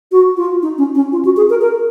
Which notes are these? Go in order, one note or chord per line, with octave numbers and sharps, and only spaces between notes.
F#4
F4
D#4
C#4
C#4
F4
F#4
G#4
A#4
A#4